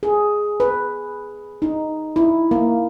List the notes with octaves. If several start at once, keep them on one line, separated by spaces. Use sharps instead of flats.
G#4
B4
D#4
E4
A#3